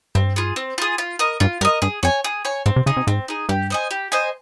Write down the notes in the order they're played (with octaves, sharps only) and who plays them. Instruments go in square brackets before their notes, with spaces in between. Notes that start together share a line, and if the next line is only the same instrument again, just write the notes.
[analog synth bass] G2 [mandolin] C4
[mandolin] F4 G#4
C4
F4 G#4
F4
A#4 D#5
[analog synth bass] G2 [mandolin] F4
[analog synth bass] G2 [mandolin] A#4 D#5
[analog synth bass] G2 [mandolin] G#4
[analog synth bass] F2 [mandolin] C#5 G#5
[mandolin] G#4
C#5 G#5
[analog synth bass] G#2 [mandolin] C4
[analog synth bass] C3
[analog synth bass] C#3 [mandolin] D#4 G#4
[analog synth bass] C3
[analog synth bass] G#2 [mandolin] C4
[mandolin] D#4 G#4
[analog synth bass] G2 [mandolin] G4
[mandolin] C5 D#5 G#5
G4
C5 D#5 G#5